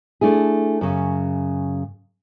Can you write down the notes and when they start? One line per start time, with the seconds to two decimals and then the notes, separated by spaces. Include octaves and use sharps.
0.21 A3 D4 E4 G#4
0.81 F#2 C#3